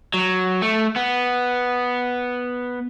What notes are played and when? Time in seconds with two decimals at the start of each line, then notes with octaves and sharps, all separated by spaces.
0.14 F#3
0.62 A3
0.96 B3